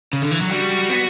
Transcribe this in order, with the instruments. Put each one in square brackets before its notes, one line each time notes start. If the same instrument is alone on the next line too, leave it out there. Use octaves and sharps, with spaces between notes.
[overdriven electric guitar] C#3
D3
E3
F#3
[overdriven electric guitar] G3 [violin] F#4
[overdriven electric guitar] B3